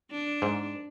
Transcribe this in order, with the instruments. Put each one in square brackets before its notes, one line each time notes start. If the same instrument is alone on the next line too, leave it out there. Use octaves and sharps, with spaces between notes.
[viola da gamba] D4
[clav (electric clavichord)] G#2